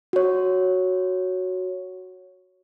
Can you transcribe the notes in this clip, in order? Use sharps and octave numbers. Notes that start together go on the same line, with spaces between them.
F#4 C#5